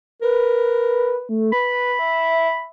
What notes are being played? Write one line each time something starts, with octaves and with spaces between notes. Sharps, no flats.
A#4 B4
A3
B4 B5
E5